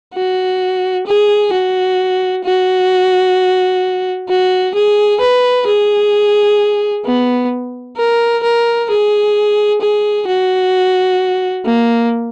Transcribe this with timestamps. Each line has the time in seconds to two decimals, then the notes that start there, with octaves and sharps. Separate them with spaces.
0.14 F#4
1.07 G#4
1.52 F#4
2.44 F#4
4.29 F#4
4.75 G#4
5.21 B4
5.67 G#4
7.05 B3
7.97 A#4
8.43 A#4
8.90 G#4
9.81 G#4
10.27 F#4
11.65 A#3